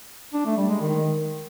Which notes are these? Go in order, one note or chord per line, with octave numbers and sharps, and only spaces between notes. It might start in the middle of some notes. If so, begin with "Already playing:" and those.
D4
A3
G3
G#3
D#3